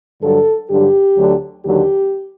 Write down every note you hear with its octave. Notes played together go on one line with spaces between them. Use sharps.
G2 D3 F#3 A4
G2 D3 F#3 G4
D2 D3 F#3
D#2 D3 F#3 G4